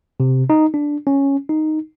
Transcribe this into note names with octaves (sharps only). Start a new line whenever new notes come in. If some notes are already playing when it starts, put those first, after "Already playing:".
C3
D#4
D4
C#4
D#4